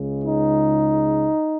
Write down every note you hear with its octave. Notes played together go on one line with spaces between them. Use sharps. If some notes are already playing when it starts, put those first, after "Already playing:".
Already playing: C#2 C#3 G#3
D#4